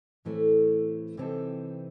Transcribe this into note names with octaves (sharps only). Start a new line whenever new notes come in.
A2 E3 A3 C4 E4
C3 E3 C4 D#4 A4